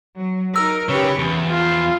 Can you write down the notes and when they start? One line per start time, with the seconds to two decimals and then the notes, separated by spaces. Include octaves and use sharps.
0.18 F#3
0.56 D#4 A#4 E6
0.89 C#3 G4 B4 C#5
1.19 E2 F3
1.49 F4